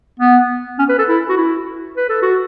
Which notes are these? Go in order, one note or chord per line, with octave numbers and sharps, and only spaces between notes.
B3
C#4
B4
A4
E4
F#4
E4
B4
A4
F#4